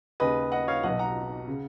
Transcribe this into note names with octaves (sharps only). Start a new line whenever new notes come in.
D#2 C#3 B4 D#5
D#5 F#5
C#5 F5
B1 B2 D#5 F#5
F#5 A#5
C#3